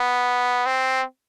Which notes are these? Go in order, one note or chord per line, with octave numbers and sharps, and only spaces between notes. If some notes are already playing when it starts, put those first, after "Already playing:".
Already playing: B3
C4